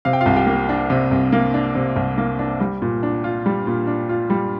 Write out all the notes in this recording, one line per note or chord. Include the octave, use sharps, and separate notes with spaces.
C3 F5
G5
F4 F5
C2
G4 G5
A#3
D4
C3
C2
A#3
D4
C3
C2
A#3
D4
G3
A#2
D4
F4
G3
A#2
D4
F4
G3